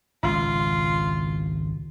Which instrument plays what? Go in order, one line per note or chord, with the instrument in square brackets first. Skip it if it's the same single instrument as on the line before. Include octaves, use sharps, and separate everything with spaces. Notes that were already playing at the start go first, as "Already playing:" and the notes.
[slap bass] G#1 C#2 [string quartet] F4